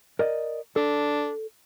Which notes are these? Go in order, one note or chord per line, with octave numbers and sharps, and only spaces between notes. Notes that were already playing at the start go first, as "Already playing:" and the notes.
A#4 D5 D#5
D4 A4